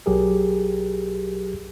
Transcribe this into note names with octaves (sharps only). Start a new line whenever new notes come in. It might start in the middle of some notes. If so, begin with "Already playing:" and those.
B1 F#3 G4 G#4 A#4